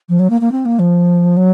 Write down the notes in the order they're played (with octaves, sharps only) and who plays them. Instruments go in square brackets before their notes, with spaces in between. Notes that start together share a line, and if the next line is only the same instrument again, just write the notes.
[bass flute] F3
F#3
A#3
A#3
C4
A#3
F3
F#3